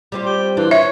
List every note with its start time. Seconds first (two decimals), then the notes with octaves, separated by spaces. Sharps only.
0.12 G3 C4 F4
0.25 G4
0.57 E3 D4 F4
0.71 C#5 E5